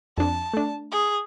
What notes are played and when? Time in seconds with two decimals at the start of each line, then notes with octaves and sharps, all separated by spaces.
0.18 F2 D4 A5
0.54 A3 D4
0.92 G#4